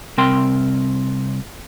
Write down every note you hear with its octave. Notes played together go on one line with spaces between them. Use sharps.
C2 C4 A#4 G5 C6